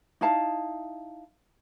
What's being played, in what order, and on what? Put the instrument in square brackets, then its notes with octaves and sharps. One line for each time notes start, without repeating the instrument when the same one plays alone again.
[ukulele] D#4 E4 F5 A5